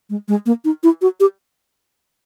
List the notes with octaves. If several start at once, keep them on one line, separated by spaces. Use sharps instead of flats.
G#3
G#3
A#3
D#4
E4
F#4
G4